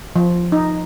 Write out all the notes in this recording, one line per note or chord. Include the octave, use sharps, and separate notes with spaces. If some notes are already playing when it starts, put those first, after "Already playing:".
F3
D#4